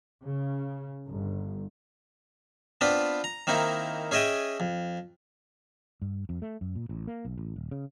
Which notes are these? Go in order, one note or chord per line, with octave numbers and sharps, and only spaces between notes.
C#3
G1
B3 C4 D4 F4 B4
A#5
D#3 A#3 C4 D#4 E4
C#4 G#4 D#5 E5 G5
F2
G2
F2
A3
F#2
A#2
A1
A#3
B1
A1
D#1
C#3